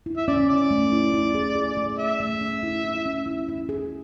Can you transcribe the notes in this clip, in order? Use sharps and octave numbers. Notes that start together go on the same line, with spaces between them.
E4
E5
C#4 D5
E4 D5
A3
E4
E4
G#4
G#4
A3
A3 E5
A3
C#4
E4
E4
C#4
E4
E4
G#4